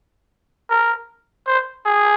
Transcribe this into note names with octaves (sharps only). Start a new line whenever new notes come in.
A#4
C5
G#4